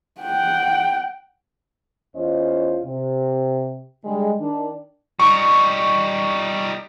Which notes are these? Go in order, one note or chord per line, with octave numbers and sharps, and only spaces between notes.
F#5 G5
E2 C#4 F4 C5 D#5
C3
D3 G3 G#3
D#3 D4
G3 D#4 C#6